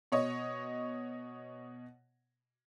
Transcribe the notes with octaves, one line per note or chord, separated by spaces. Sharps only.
B2 C#5 D#5